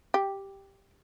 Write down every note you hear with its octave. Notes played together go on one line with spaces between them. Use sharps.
G4